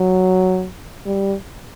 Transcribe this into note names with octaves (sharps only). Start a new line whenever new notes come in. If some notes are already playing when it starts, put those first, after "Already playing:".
Already playing: F#3
G3